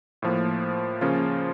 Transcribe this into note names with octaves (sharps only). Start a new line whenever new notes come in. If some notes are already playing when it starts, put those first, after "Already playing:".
A2 F3 A#3
C#3 F3 A#3 C#4 F4